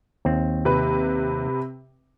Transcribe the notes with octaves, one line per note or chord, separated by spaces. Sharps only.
D#2 C4
C3 B4